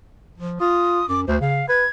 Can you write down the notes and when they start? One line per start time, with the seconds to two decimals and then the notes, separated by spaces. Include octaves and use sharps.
0.38 F3
0.60 F4 D#6
1.09 F#2 D6
1.28 D2 C5
1.41 C#3 F5
1.69 B4 G#6